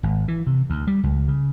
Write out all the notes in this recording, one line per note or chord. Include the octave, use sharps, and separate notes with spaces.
G#1
E3
C3
D2
G3
C#2
C#3